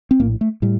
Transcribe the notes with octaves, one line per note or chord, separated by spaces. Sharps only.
C4
A#1 A2 A#3
A3
A2 G3